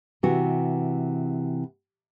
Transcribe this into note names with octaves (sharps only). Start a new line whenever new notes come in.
C3 E3 F#4